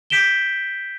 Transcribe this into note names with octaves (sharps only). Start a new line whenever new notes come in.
G6 B6 D7 E7 G7